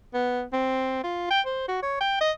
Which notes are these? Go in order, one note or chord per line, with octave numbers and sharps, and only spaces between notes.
B3
C4
F4
G5
C5
F#4
C#5
G5
D#5